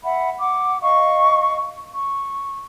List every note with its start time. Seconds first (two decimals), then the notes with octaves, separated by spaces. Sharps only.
0.04 E5 F#5 B5
0.38 F#5 D6
0.82 D#5 F5 C#6
1.94 C#6